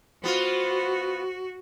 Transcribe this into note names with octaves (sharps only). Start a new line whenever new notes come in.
B3 F4 F#4 C5